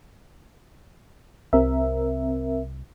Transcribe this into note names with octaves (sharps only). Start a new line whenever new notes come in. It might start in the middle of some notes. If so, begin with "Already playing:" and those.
C2 C4 A#4 E5